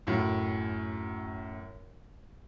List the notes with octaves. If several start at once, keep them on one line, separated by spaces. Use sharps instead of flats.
F#2 A2